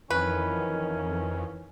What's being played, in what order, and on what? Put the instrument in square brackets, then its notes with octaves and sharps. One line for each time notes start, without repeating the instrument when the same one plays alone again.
[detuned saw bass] F2 [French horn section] D#3 E3 [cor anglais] C#4 [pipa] B4